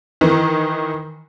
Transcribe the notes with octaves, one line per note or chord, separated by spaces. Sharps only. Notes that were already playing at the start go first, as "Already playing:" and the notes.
D#3 E3